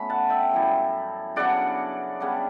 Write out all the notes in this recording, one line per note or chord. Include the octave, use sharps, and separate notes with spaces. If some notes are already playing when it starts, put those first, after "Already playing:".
Already playing: B2 A3 C#4 B5
F#5 A5
E5 G5
F#2 E3 G3
C#3 F#3 B3 D4 D5 F#5
C#3 G3 B3 D4